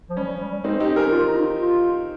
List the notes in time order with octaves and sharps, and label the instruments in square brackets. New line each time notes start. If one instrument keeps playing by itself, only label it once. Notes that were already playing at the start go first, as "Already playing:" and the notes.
[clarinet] F3
[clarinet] G3 [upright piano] C#4
[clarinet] F3
G3
G3
[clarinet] G#3 [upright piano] C4 D#4
[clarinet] C4 [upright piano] D#4 G4
[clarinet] C#4 [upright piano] G4 A#4
[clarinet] F4
D#4
F4
F4